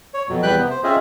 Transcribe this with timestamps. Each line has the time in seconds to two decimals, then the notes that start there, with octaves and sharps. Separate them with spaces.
0.14 C#5
0.29 F2 B2 F#3
0.43 E2 G3 B4 G5 B5 F#6
0.58 C3 B3
0.71 C5
0.84 C4 C#4 F4 G#4 D#5 E5